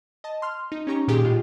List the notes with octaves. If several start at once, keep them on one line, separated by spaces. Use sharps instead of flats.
D#5 A5
C6 F6
D#4
C#4 D#4 G4 A#5 C#6
A#2 D#3 G4 G#4
A2 G#3 F4